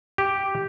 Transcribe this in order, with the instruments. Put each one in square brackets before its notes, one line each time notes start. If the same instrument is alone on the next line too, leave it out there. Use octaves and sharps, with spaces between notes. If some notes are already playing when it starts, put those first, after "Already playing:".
[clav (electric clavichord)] G4